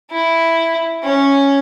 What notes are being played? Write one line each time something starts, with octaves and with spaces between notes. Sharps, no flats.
E4
C#4